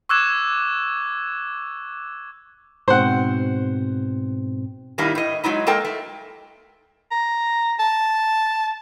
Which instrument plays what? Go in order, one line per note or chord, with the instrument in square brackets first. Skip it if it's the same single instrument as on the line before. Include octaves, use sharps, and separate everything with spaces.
[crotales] C#6 D6 E6 F#6 G#6 E7
[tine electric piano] G#2 B2 C4 [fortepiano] C5 F#5
[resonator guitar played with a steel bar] D#3 G3 A#3 D#4 E4
A2 D#5
F#3 G#3 D#4 E4
G#3 A#3 A4 A#4 G5
A3
[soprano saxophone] A#5
A5